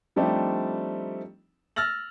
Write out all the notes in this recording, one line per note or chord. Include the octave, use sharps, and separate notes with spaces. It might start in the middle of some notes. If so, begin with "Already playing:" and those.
F3 G3 A3 C4 D4 D#4
E6 F6 A6 A#6 F#7